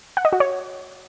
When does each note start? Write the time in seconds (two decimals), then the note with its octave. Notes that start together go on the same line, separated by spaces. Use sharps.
0.17 F#5
0.25 D#5
0.33 F#4
0.40 C#5